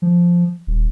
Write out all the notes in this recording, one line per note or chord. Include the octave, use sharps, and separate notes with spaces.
F3
D#1